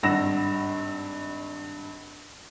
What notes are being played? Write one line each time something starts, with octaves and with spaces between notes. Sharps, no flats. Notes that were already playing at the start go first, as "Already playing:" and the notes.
G#1 G2 F#5 E6 A#6 E7